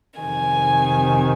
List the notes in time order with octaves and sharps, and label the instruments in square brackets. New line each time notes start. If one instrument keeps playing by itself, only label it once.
[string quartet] F2 C3 D#3 G#5